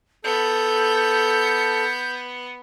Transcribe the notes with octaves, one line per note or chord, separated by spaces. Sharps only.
B3 A4 G6